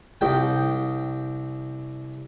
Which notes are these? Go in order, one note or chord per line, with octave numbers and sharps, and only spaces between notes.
C2 G5